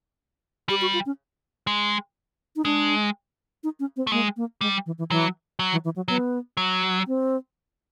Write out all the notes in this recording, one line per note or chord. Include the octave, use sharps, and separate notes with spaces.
G3 G4
F#4
F4
C#4
G#3
D#4
G#3 D4
D#4
C#4
C4
A3
G#3 A#3
A#3
G3 G#3
E3
E3
E3 F#3
F#3
E3
E3
F#3
F#3 B3
F#3
C4